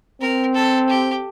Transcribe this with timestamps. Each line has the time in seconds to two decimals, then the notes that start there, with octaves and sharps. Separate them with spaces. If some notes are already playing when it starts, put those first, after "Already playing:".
0.21 C4 A#4
0.55 A4
0.89 G4